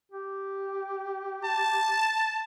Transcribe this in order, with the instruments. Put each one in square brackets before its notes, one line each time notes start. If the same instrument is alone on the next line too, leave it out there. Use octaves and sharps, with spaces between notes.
[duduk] G4
[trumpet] A5